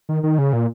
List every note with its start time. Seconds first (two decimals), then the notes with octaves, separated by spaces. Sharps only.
0.09 D#3
0.23 D#3
0.38 C#3
0.53 A#2